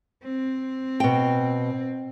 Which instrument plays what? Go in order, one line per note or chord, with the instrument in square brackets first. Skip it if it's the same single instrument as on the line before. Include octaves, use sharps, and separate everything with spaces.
[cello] C4
[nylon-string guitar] B2 G5